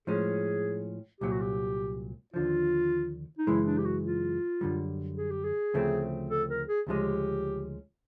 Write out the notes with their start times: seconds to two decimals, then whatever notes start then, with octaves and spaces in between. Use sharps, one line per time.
0.07 A2 F3 G#3 C#4 G#4
1.21 C2 A#2 F#3 G4
1.31 F#4
1.41 G4
2.34 D#2 D3 F3 F4
3.38 D#4
3.47 F#2 C#3 E3 G#3 E4
3.66 D4
3.78 G4
3.85 F#4
4.04 F4
4.61 F#2 D3 G3
5.17 G#4
5.31 G4
5.44 G#4
5.74 D2 C#3 F3 A3 C4
6.30 A4
6.49 A#4
6.67 G#4
6.87 D2 C#3 F3 G#3 C#4 G4